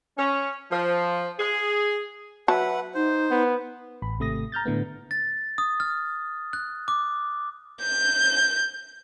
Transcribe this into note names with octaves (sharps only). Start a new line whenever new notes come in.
C#4
F3
G#4
F#3 B4 E5 F#5 A5
D#4 C5
B3
A1 B5
G#1 C3 A3 D#6 A#6
A#5 F6 G6 A6
A2 D3 A3 B3
A6
D#6
F6
F#6
D6
G6